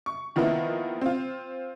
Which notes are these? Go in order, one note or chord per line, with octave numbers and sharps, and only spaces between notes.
C#6
D#3 F3 A#3 B3 E4
C4 F4